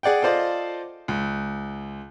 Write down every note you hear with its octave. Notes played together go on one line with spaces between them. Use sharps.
G#4 D5 F#5 G5
F4 A4 C5 D5 D#5
C#2